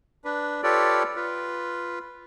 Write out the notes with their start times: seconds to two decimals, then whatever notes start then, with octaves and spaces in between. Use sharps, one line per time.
0.25 D4 B4
0.63 F4 G4 A4 B4 C#5 D5
1.16 F4 B4